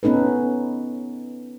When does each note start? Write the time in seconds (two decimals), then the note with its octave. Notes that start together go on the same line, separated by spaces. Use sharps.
0.03 B3 C#4 D#4 A4 B4